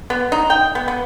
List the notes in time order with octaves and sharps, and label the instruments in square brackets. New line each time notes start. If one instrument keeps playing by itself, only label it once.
[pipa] B3
D#4
G5
B3
B3